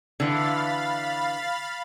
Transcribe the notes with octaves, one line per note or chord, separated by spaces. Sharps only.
D3 E3 F5 B5 A6